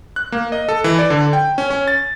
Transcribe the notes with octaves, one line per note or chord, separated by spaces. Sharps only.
F#6
A#3
D#5
A4
E3
D5
D3
G5
C#4
C#4
A6